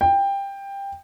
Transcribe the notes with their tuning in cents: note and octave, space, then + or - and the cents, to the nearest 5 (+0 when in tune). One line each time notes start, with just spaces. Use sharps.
G5 +15